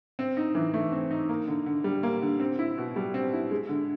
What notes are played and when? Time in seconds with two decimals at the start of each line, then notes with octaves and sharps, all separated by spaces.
0.19 C4
0.37 D#4
0.55 E3
0.74 A3
0.92 C4
1.11 D#4
1.29 A#3
1.48 D3
1.66 D3
1.84 G3
2.03 A#3
2.22 D3
2.40 C4
2.59 E4
2.78 B2
2.96 G3
3.14 C4
3.33 E4
3.51 G#3
3.69 D3